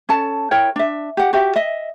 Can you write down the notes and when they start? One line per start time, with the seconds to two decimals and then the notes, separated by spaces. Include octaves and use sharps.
0.09 C#4 A4 A5
0.51 E4 A#4 C#5 G5
0.76 D4 E5
1.17 G4 F#5
1.33 F#4 G4 E5
1.56 D#5 E5